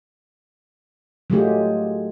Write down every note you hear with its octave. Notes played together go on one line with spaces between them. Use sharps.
F#3 G#3 A3 F4 G4 G#4